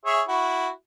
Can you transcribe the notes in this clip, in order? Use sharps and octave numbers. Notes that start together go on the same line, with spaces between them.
G#4 C#5 E5
E4 F#4